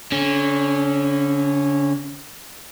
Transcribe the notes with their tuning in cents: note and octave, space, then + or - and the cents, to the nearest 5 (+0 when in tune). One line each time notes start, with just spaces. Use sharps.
D3 -45 C#4 -15